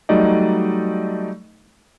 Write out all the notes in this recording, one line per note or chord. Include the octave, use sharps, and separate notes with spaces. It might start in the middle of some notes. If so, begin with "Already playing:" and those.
F#3 G3 A3 D#4 D5 D#5